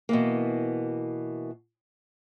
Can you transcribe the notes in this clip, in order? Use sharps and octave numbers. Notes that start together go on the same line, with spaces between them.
B2 E3 A#3